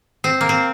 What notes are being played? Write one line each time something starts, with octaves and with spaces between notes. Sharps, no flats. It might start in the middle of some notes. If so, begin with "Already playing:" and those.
C4
A#3
C4